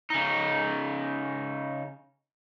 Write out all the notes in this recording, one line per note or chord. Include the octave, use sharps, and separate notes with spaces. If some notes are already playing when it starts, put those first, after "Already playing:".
C#3 D#4